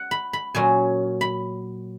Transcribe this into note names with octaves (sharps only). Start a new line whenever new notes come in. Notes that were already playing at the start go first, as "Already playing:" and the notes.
Already playing: F#5
B5
B5
A#2 F#3 C#4 G#5
B5